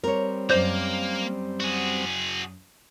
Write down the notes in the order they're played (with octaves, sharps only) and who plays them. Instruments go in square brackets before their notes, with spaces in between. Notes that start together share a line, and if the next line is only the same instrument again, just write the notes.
[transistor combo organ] G3 C4 [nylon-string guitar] A#4 C#5
[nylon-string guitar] F#2 D5 [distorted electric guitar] A#3 [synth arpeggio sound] C5 G6
[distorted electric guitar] F#4 G#4